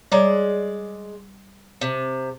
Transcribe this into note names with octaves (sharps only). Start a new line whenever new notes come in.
G3 G#3 C#5 D5 A#5
C3